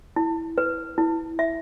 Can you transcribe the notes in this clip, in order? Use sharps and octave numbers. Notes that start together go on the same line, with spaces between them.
E4
B4
E4
E5